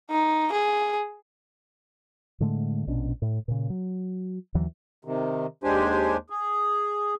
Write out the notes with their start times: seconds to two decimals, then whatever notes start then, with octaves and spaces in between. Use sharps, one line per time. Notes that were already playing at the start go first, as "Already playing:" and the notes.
0.10 D#4
0.52 G#4
2.40 A2 D3 G#3 A3
2.87 A#1 B2 C#4 D4
3.22 A2
3.48 A#2 C#3
3.70 F#3
4.55 D#2 D3 E3 F#3
5.05 C3 D#3
5.64 D#2 G#3 D4 G4 C5 G#5
6.30 G#4